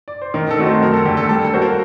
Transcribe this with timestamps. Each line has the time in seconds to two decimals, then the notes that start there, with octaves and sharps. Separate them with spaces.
0.08 D5
0.22 C5
0.34 D#3 A#4
0.51 A4
0.58 A3 C4 D#4 F#4
0.66 C5
0.83 F#2 A#4
0.93 A4
1.06 D3 A3 G4
1.17 A4
1.29 G3 A4
1.45 A4
1.53 A#3 F#4 C5
1.62 A#4